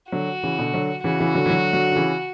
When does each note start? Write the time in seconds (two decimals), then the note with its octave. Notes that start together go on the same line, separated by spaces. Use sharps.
0.12 D3 F#3 F#4
0.43 C#3 E3
0.59 B2 D3
0.74 D3 F#3
1.04 C#3 E3 F#4
1.20 C#3 E3
1.35 D3 F#3
1.46 E3
1.50 D3 F#3
1.73 D3 F#3
1.92 D3
1.96 C#3 E3